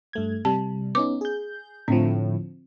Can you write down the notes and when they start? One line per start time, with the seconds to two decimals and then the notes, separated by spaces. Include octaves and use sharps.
0.13 G2 A3 G#6
0.45 C3 G3 A5
0.95 B3 C#4 D#4 D6
1.21 G#4 G6
1.88 A2 D3 F3 C4